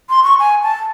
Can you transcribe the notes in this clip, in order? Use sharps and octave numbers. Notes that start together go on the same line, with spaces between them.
C6
C#6
G#5
A5